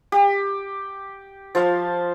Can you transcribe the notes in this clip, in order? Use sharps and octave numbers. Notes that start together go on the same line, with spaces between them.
G4
F3 C5 F5